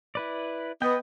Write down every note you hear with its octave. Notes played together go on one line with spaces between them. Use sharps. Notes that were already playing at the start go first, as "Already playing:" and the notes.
E4 B4 D5
B3 B4 D#5 G5